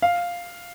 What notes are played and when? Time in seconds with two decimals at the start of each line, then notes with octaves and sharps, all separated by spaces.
0.02 F5